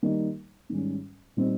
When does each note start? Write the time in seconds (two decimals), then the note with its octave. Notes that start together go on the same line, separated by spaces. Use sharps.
0.03 D#3 G3 A#3 D#4
0.69 G#2 D#3 G3 C#4
1.37 A#2 G3 C4 D#4